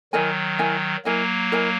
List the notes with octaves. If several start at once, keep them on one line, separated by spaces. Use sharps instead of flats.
D#3 F#3 E4 A#4 D#5 G#5
E4 A#4 D#5 G#5
F#3 A#3 E4 A#4 D#5 G#5
E4 A#4 D#5 G#5